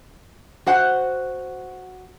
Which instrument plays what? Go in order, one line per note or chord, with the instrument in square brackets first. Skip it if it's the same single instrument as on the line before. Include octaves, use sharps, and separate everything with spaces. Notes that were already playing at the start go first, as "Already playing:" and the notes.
[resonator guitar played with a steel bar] F#4 C5 F#5